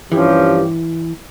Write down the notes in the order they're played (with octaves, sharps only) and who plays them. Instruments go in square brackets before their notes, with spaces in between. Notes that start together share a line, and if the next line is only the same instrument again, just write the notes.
[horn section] G2 F3 C#4 G4 [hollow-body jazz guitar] E3